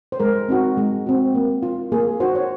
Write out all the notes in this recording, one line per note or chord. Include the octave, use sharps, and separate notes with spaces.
C5
G#3 A#4
C4 D#4 F#4
G#3
C4 F#4
A#3
F4
A#3 G#4
D#4 F#4 C5
C#5